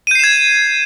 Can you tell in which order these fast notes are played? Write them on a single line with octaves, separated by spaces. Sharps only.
D#7 G6 C7 E7 G#6